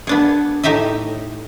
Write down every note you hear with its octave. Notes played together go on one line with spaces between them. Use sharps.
B3 D4 G#4
A2 D#4 G4 D#5 E5